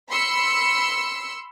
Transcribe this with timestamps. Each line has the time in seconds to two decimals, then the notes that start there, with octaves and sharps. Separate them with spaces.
0.10 B5 C6 E6 C#7